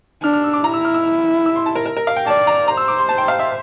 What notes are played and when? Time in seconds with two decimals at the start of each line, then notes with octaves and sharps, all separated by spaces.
0.23 D4 F6
0.34 F6
0.44 E6
0.53 D6
0.64 E4 A#5
0.74 E6
0.85 F6
0.94 E6
1.46 E6
1.56 C6
1.66 A5
1.76 A#4
1.86 A#4
1.97 A#4
2.07 F5
2.17 G5
2.27 D5 A5
2.47 A#5
2.68 C5 A#5
2.77 E6
2.88 D6
2.99 C6
3.09 A5
3.18 G5
3.28 F5
3.39 E5